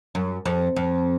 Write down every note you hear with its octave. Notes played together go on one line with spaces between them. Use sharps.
F#2
F2
F2